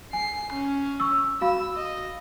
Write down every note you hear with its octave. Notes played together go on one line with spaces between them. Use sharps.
G#5 C7
C#4
C#6 E6
F#4 F5 B5 E6
D#5